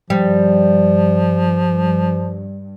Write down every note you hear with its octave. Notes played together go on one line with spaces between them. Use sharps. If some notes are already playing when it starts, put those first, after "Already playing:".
G2 F3 G3